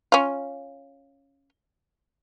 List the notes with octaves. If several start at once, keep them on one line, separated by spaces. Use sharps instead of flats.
C#4 F4